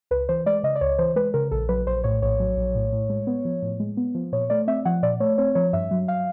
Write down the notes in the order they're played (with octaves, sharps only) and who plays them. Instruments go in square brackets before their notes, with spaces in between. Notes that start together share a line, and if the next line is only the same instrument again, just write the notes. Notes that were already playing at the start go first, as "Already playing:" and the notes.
[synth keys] C#2 B4
E3 C5
G#3 D5
C#3 D#5
D5
C#2 C#5
E3 C5
G#3 B4
C#3 A#4
A#1 A4
F#3 B4
A#1 C5
A2 C#5
A#1 C#5
F#3
A#1
A2
A2
G#3
B3
F3
A2
G#3
B3
F3
A#2 C#5
A3 D5
C4 E5
F3 F#5
A#2 D5
A3 C#5
C4 C#5
F3 C#5
G2 E5
F#3
F5